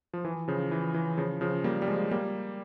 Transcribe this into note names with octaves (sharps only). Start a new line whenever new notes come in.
F3
E3
C#3 F3
E3
E3
C#3 F3
C#3 F3
G3 A#3
G3
F3 G#3
G3 A#3